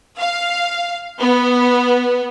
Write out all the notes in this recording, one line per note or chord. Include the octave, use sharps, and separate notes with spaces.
F5
B3